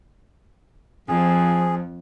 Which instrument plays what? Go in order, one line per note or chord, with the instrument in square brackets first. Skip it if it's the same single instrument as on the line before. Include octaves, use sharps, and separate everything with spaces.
[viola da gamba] F2 [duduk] F3 [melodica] G#4